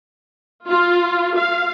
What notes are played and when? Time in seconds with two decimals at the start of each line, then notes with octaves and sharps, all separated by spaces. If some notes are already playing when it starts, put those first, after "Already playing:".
0.67 F4
1.36 F5